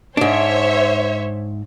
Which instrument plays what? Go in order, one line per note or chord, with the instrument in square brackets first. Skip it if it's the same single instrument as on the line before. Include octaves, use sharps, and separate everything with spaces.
[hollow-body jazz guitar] G#2 D4 [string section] C5 C#5 E5